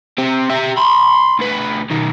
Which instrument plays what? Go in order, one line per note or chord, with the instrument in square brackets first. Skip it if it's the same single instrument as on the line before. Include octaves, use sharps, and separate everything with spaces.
[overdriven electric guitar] C4 G4
G4 E5
B5 C6
D2 B4
B2 D#3